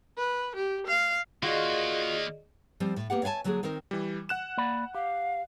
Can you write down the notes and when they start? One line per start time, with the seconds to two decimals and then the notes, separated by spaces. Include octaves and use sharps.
0.17 B4
0.56 G4
0.87 F5
1.43 D#3 A#3 F4 F#4 G#4 D5 D#5
2.80 F3 G3 C4
2.96 A2
3.10 A#3 B3 G4 F#5
3.23 C#5 E5 F5 G#5 A5
3.44 D3 F#3 A#3 F#4 G#4
3.63 D#3 C4 D#4 A#4
3.91 E3 G3
4.29 F#5 F#6 E7
4.57 A#3 D5 B5
4.95 G4 F5